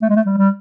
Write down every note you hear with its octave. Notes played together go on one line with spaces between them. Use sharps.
A3
G#3
A3
G3
G3